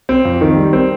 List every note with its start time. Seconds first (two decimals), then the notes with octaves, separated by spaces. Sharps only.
0.09 C4
0.25 F2
0.41 D#3
0.57 G3
0.73 C4